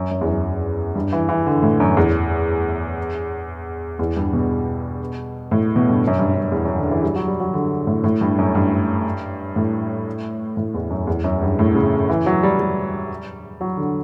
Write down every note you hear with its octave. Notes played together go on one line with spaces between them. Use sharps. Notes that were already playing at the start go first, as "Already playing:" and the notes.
Already playing: F#2
F#2
E2
F#2
G2
E3
E3
D3
A2
F#2
E2
E2
G2
B2
A2
B2
G2
F#2
G2
F#2
E2
F#2
D3
E3
G3
F#3
G3
F#3
D3
A2
A2
G2
F#2
G2
A2
A2
E2
F#2
E2
F#2
G2
A2
C#3
E3
F#3
G3
G3
F#3
D3